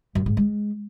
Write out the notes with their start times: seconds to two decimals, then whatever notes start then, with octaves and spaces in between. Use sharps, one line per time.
0.15 F#2
0.26 G#2
0.37 G#3